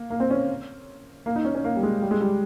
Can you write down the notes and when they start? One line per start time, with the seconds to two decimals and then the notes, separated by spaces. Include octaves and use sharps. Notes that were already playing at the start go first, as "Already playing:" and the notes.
Already playing: A#3
0.10 A#3
0.20 C4
0.30 C#4
1.26 A#3
1.36 D#4
1.45 C#4
1.55 C#4
1.64 A#3
1.76 G3
1.83 G#3
2.02 G3
2.11 G#3
2.21 G3